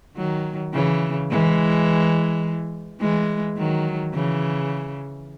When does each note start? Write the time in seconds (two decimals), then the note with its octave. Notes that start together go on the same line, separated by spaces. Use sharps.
0.16 D#3 F#3
0.73 C#3 E3
1.30 E3 G#3
3.00 E3 G#3
3.57 D#3 F#3
4.13 C#3 E3